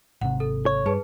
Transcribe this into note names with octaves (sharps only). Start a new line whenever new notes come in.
G#1 C3 F#5
A4
C#5
G2 G#4 B4 A5